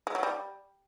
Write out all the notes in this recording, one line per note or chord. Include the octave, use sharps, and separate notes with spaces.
G#3
F#3
G3